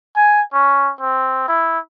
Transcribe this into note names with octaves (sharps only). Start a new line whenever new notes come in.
G#5
C#4
C4
E4